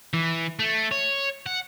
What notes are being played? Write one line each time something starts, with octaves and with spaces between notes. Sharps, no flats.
E3
A3
C#5
F#5